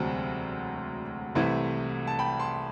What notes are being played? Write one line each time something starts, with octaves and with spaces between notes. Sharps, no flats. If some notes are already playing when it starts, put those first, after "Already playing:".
Already playing: E1 D2 C3 F#3 C4 F#5 A5
C2 C3 E3 A3 E4
A5
G5 B5
A5 C6